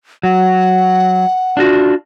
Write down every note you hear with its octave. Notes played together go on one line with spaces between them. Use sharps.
F#3 F#5
D4 F4 F#4